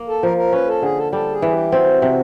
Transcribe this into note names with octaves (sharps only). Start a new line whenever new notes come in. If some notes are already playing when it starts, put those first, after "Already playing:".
Already playing: A#3
A4
F3 A#4
A#4
C#4 B4
A4
D3 G#4
A4
G3 A4
G#4
E3
G4
C4 F#4
C3